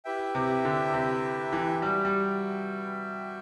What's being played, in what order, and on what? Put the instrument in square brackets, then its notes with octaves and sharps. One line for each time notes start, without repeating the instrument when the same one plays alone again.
[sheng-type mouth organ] E4 G4 B4 E5 G5
[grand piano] C3
D3
C3
E3
[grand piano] G3 [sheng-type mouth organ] F#4 B4 E5 G5
[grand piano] G3